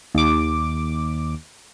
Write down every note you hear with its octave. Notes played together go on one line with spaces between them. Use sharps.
D#2 D6